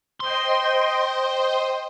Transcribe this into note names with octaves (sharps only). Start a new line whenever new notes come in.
C5 D#5 G5 C6